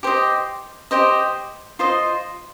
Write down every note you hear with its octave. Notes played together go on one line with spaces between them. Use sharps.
G4 C5 D#5
G4 C5 D#5
F4 C5 D#5